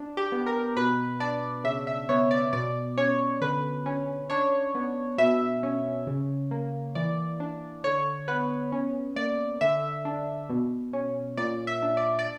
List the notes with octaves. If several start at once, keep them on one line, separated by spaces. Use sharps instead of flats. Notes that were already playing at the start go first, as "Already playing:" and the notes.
Already playing: D4
G4
B3
A#4
B2 B4
D4 D5
C#3 E5
E5
B3 C#5
D5
B2 D5
C#4 C#5
D3 B4
C#4
D4 C#5
B3
B2 E5
C#4
C#3
A#3
E3 D5
D4
D3 C#5
B3 B4
C#4
A#3 D5
D3 E5
D4
B2
C#4
A#2 D5
E5
D4
D5
D5